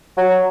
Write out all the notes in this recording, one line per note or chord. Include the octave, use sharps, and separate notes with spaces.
F#3